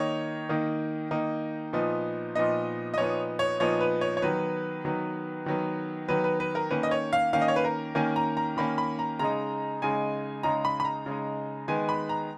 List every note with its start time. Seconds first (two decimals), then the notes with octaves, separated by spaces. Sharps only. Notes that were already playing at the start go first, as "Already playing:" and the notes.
Already playing: D#3 A#3 D#4 C#5
0.49 D#3 A#3 D#4
1.11 D#3 A#3 D#4
1.73 A#2 F3 B3 D#4
2.35 A#2 F3 B3 D#4 D#5
2.94 D#5
2.98 A#2 F3 B3 D#4 C#5
3.39 C#5
3.60 A#2 F3 B3 D#4 C#5
3.81 B4
4.01 C#5
4.17 C#5
4.22 D#3 F#3 B3 B4
4.85 D#3 F#3 B3
5.46 D#3 F#3 B3
6.08 D#3 F#3 B3 B4
6.24 B4
6.40 B4
6.55 A#4
6.71 D#3 A#3 C#4 B4
6.83 D#5
6.91 C#5
7.13 F5
7.33 D#3 A#3 C#4 F5
7.42 D#5
7.48 C#5
7.56 B4
7.64 A#4
7.95 D#3 A#3 C#4 G#5
8.16 A#5
8.37 A#5
8.57 D#3 A#3 C#4 B5
8.78 B5
8.99 A#5
9.19 C#3 G#3 D#4 A#5
9.82 C#3 G#3 D#4 G#5
10.43 C#3 G#3 D#4 A#5
10.65 B5
10.80 B5
10.85 A#5
11.06 C#3 G#3 D#4
11.68 D#3 G#3 B3 G#5
11.89 B5
12.09 A#5